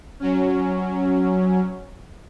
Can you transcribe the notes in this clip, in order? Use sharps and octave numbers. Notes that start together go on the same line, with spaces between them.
F#3 C#4